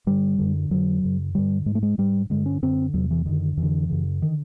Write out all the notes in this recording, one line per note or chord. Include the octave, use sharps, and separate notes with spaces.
G2 D3 G3
F#2 D3
F2 D3 F#3
F#2 C#3
G2 D3 G3
G#2 G#3
A3
G#3
G#2 G3
G2 D3 G#3
C#4
F#2 D3 C4
E2 C3 F#3
E3
F#2 D3 D#3
F2 E3
D3
F#2 C#3
D3 D#3